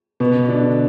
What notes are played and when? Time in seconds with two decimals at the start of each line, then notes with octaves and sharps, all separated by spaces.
0.20 B2 B3
0.48 D3 D4